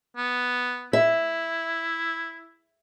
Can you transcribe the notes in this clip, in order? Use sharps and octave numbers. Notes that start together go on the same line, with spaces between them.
B3
E4 E5